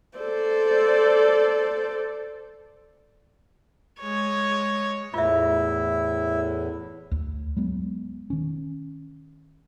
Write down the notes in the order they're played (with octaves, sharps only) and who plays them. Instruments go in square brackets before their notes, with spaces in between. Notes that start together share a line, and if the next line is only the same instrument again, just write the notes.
[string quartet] A4 C5 D5
[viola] G#3 C#5
[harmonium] E2 A2 [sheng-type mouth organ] E4 [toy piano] F4 E5
[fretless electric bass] D2
F#3 G#3 B3
D#3 C#4